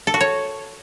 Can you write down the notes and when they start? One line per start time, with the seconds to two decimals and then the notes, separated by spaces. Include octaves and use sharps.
0.07 A4
0.14 F#4
0.21 C#5